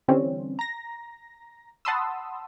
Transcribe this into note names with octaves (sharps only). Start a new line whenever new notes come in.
D3 E3 G3 C4 C#4
A#5 A#6
F#5 A5 B5 C6 D#6 E6